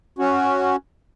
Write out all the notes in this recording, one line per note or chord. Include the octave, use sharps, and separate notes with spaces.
C#4 F#4